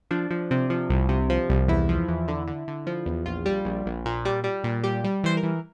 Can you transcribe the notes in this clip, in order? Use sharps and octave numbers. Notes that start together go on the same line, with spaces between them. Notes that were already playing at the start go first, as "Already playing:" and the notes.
F3 D4
F3
C3
F3
C2
C3
F3
C2
E2 E4
F3
E2
D3
D3
D3
F3
E2
A#1 F4
G3
A#1
A#1
A#2
G3
G3
A#2
G3 G4
G3
E3 C5
A#4
E3